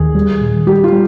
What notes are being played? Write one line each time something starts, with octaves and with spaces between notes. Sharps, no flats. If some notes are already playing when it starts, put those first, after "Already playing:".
Already playing: D#2 D#3 G#4
G3
A#2
G3 G4
F4
G3